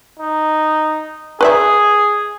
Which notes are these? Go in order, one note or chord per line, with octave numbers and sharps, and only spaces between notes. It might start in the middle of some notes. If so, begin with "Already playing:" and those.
D#4
G#4 B4 D5 E5